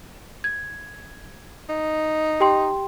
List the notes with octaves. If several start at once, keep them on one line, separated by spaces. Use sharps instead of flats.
G#6
D#4
G4 G5 C6